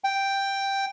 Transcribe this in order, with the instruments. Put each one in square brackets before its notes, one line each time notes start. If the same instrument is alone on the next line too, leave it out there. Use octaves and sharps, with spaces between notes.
[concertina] G5